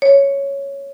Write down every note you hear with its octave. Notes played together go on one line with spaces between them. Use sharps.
C#5